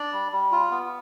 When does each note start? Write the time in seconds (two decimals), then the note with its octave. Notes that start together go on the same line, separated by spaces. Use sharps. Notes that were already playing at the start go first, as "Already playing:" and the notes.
Already playing: D4 D5
0.12 G3
0.32 G3
0.52 F4
0.71 B3